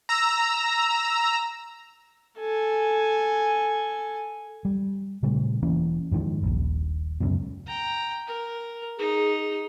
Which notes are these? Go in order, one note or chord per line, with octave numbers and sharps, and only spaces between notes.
A#5 E6
A4 G#5
G3
A#2 C#3 G3 A3
E1 E3 A#3 C#4
F2 G#2 D#3 F3
D#1 A#1
C#2 F#2 B2
G5 A#5
A#4
D#4 G#4